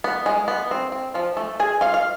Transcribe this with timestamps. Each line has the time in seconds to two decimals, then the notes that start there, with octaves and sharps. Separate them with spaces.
0.04 B3
0.26 G#3
0.48 B3
0.71 C4
0.92 C4
1.14 F3 F4
1.37 A3 A4
1.60 G#4 G#5
1.81 F4 F5
1.94 F5